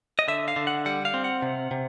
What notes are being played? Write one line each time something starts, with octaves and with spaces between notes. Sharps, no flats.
D#5
D3 E5
F5
D3
F#5
G3 F#5
F5
C4
F#5
C3
C3